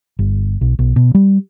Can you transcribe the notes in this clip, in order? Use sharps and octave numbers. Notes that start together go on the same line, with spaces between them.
G1
B1
B1
B2
G3